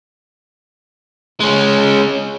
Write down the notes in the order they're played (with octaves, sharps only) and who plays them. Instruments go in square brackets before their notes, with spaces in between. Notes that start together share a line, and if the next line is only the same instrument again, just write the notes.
[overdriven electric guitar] G#3 C#4